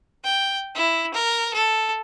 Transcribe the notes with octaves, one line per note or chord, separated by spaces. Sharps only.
G5
E4
A#4
A4